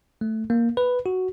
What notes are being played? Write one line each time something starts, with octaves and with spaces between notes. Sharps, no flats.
A3
A#3
B4
F#4